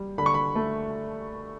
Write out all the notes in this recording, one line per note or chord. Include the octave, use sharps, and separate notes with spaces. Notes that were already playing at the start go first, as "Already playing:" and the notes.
Already playing: G3
D3 B5
C#6
B5
A3